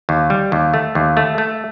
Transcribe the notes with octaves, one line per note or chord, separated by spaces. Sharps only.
D#2
G3
D#2
A3
D#2
A3
A3